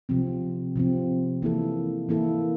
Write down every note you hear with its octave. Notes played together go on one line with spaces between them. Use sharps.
C3 F3 C4
C3 F3 C4
E3 A#3 E4 A4
E3 A#3 E4 A4